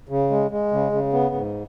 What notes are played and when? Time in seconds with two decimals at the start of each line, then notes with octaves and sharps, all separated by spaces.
0.09 C#3
0.30 G#3
0.51 G#3
0.72 C#3
0.92 C#3
1.13 B3
1.35 G#2